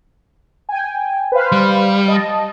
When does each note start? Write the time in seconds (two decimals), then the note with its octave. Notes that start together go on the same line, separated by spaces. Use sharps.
0.69 G5 G#5
1.32 B4 C5 F5
1.52 G3
2.08 D#5 A5